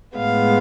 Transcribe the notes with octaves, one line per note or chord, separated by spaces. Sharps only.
A2 G#3 B3 F5